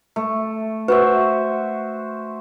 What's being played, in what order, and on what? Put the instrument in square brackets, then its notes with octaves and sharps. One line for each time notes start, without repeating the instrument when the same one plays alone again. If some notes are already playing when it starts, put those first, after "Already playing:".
[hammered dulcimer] A3
[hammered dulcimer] F#4 C5 E5 [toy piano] B4